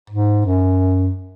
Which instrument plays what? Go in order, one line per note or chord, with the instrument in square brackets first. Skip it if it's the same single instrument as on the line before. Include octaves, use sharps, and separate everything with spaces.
[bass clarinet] G#2
F#2